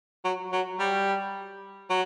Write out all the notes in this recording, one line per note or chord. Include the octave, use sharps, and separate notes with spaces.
F#3
F#3
G3
F#3